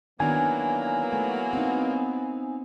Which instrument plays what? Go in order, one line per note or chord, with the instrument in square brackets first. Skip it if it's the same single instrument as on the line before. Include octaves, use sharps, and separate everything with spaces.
[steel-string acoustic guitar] D#3 D4 [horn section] E3 F#3 A#3 [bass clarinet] B3 [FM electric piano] G#5
[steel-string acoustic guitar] A3
C4 D#4